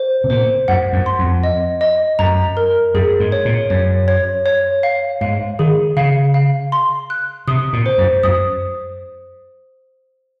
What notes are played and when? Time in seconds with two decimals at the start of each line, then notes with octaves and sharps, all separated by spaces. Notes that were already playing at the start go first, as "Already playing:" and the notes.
Already playing: C5
0.24 C3
0.30 A#2 C5
0.68 F#2 F#5
0.93 F#2
1.06 C6
1.19 F2
1.44 D#5
1.81 D#5
2.19 F#2 A#5
2.57 A#4
2.94 F#2 G#4
3.20 G#2
3.32 C#5
3.45 A#2
3.70 F#2 C#5
4.08 C#5
4.46 C#5
4.83 F5
5.21 G#2 F5
5.59 D#3 G#4
5.97 C#3 F5
6.34 F5
6.72 C6
7.10 F#6
7.48 C3 D#6
7.73 A#2
7.86 C5
7.98 F#2
8.23 F#2 D#6